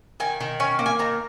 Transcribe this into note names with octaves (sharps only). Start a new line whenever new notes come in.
D#3 G#5
D#3
C#4 G#5
A#3
G#5
D#3 A#5